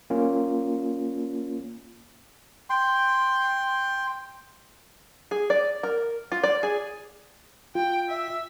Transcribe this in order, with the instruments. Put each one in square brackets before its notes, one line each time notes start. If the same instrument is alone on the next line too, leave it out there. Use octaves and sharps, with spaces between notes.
[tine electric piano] A#3 C#4 F4
[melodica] G5 C6
[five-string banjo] G#4
D5
A#4
F4
D5
G#4
[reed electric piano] F4 [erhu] G5
[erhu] E5